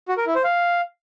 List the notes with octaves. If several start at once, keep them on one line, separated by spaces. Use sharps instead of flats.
F#4
A#4
E4
C5
F5